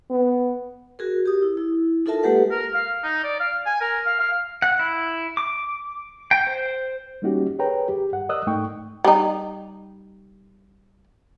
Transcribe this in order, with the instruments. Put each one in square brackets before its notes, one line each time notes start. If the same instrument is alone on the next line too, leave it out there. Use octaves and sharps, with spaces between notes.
[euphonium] B3
[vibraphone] F#4 G#4 A#4
G4 D#6
E4
E4
D#4 F4 A4 A#4 E5 A5
G#3 A#3 G4 A4 B4 F#5
[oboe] A#4
F5
D#4
D5
F5
G#5
A#4
F5
F5
[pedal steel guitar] F#5
E4
D6
G5
C5
[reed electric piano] G3 A#3 C#4 D#4 F#4 G4
G#4 A#4 B4 C#5 G5 A#5
G4
G2 F#5
A#4 D5 D#5 D#6 E6 F#6
G#2 A3 D#4 G5 C#6
[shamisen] G3 D#4